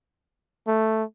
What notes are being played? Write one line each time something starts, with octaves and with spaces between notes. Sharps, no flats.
A3